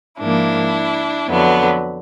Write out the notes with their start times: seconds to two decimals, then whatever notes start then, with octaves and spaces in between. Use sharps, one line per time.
0.20 G#2 F3 A#3 D4 E4
1.27 F2 D3 F#3 B3